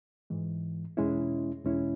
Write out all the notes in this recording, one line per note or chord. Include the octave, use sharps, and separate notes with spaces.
G#2 E3 G#3
E2 B2 G#3 C#4 E4
E2 B2 G#3 C#4 E4